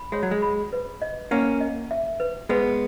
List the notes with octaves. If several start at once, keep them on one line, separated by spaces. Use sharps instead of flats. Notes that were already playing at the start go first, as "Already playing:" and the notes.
Already playing: B5
G#3 C#5
F#3
G#3
B5
B4
D#5
A#3 C#4 F#5
D#5
E5
B4
G#3 B3 B4